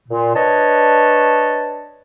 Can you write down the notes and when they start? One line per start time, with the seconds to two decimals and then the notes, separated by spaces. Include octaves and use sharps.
0.09 A#2
0.34 D4 B4 C#5 D#5 A5